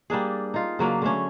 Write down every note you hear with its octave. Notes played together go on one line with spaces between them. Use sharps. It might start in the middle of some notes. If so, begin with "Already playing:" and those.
G3 A#3 D4 G#4
D#4 F4
C#3 F#3 A#3 D4
D3 A3 C#4